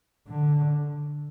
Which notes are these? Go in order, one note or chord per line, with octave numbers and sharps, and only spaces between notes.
D3